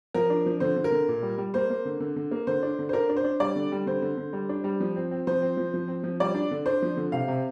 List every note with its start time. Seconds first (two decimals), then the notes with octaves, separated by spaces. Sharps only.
0.14 F3 A#4
0.30 D4
0.46 F3
0.60 D3 C5
0.76 D3
0.84 A#4
0.92 D3
1.08 A#2
1.22 G3
1.38 G3
1.54 A#3 C5
1.70 A#3
1.85 D3
2.00 D3
2.16 D3
2.31 A#3
2.47 D3 C5
2.63 D4
2.79 D3
2.89 C5
2.93 D4 A#4
3.09 D4
3.17 C5
3.24 D4
3.40 G3 D5
3.56 D3
3.72 G3
3.86 D3 C5
4.02 D3
4.17 D3
4.33 G3
4.49 D4
4.64 G3
4.80 F3
4.96 C4
5.11 C4
5.27 F3 C5
5.42 C4
5.57 F3
5.74 F3
5.88 C4
6.04 F3
6.20 G3 D5
6.35 D4
6.51 D3
6.66 D4 C5
6.82 F3
6.97 D3
7.12 C3 F5
7.28 C3